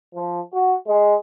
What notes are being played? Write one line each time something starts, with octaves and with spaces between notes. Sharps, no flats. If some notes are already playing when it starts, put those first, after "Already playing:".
F3
F#4
G#3